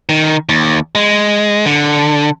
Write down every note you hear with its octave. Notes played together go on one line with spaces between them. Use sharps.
D#3
D#2
G#3
D3